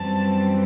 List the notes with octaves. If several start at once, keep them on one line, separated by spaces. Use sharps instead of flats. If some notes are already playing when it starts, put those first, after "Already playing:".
Already playing: F#2 E3 G3 C4 A5